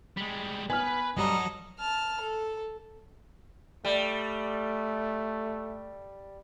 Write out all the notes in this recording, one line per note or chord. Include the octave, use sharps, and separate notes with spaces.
G3 G#3
B3 B4 G#5 B5 F6
G2 F#3 G3 A4 D#5 A#5
A5 F6
A4
G3 A3